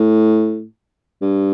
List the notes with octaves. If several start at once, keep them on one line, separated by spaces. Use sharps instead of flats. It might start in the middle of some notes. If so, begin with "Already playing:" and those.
Already playing: A2
G2